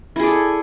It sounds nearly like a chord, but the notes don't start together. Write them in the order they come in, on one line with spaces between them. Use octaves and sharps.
E4 G#4 D5 A4